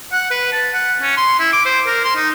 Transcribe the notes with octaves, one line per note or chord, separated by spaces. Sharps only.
F#5
B4
A5
F#5
C#4
C6
E4
D6
C5
A#4
C6
D#4